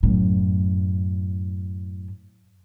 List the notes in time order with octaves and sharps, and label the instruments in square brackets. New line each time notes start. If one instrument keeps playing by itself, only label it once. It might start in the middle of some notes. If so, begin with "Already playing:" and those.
[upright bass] F#2 A2